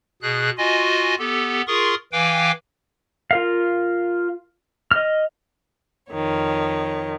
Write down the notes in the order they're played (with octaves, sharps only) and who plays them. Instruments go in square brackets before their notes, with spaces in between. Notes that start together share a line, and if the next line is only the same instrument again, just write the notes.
[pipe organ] B2 G#4 F#6
F4 F#4 D#5 G#5
B3 G4 A4
F4 G#4 A#4 C6 C#6 D#6
E3 B4 F5 G5 G#5 D6
[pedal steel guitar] F4 A#4 F5
D#5 F6
[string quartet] F2 D#3 C#5